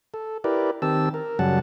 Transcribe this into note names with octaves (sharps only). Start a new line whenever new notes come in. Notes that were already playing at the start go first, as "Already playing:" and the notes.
A4
E4 G4 A#4 B4 D5
D#3 C4 G4 A5 E6
A#4
F#2 C#3 F#3 G3 F#5 A5